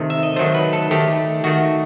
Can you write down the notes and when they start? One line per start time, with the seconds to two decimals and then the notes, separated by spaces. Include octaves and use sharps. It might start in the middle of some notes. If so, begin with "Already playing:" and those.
Already playing: C3 D#3 A3
0.10 E5
0.23 D#5
0.36 D#3 F#3 A3 C5
0.55 B4
0.73 A4
0.91 D#3 A3 G4
1.44 D#3 A3 F#4